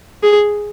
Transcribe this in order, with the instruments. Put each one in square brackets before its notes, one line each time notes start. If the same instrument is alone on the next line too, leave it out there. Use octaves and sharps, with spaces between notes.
[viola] G#4